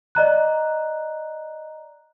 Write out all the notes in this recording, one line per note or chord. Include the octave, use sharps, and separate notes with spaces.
D5 D#5 A#5 F#6